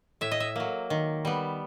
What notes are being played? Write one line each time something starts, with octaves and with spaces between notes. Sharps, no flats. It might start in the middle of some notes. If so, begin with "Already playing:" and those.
A2 E5
D#5
E5
F#3 A#3
D#3
G3 B3